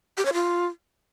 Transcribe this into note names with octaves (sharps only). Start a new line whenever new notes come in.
G4
C#5
F4